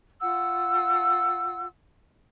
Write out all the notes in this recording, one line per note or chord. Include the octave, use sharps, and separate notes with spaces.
F4 F#5 E6